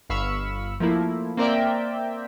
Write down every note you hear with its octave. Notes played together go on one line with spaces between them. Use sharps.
G1 F5 B5 C#6 E6
F3 A3 A#3 E4
A#3 C4 A#4 D5 E5 G5